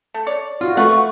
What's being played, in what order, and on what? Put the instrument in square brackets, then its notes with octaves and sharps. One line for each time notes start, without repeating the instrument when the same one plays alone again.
[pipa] A3
C#5 D5
[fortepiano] F4 [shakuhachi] F#4
[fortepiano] A3 [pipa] F4 B4 F#5 [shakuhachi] C#6